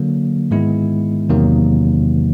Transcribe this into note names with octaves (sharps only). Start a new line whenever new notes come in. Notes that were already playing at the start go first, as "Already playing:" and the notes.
Already playing: D3 F#3 A#3
G#2 D#3 G#3 B3 E4
E2 C3 D#3 F#3 A#3